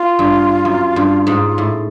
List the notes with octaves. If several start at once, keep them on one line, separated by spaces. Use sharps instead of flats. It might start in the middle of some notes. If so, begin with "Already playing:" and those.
Already playing: F4
G2
F#2
G2
G#2
A2